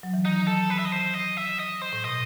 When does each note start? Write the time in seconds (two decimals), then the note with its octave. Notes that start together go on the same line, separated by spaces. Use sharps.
0.03 F#3
0.14 E3
0.25 D#3 D#4
0.47 A4
0.70 B4
0.78 E5
0.85 D#5
0.92 C5
1.14 D#5
1.37 E5
1.59 D#5
1.82 C5
1.93 A2
2.04 B2 D#5